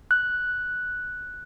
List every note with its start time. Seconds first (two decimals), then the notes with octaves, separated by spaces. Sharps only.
0.11 F#6